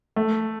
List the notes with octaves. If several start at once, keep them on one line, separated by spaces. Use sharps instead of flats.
A3